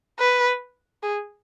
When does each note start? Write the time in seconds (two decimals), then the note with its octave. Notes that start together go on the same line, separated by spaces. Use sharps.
0.19 B4
1.03 G#4